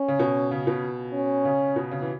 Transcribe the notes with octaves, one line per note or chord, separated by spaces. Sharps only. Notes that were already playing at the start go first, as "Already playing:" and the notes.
Already playing: C#4
C#3
B2
C#3
B2
C#4
C#3
B2
C#3
E3